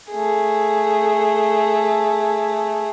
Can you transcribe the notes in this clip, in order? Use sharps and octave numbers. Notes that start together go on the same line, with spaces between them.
A3 G#4